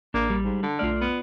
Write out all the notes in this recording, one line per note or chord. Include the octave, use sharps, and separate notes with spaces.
A1 A#3 D4
G3
G#2
D3 A4
B1 A3 F4 D5 F6
B3